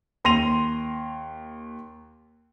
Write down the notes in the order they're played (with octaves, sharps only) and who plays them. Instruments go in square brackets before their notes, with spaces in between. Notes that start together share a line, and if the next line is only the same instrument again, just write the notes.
[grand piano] D#2 C6 A#6 D#7 F7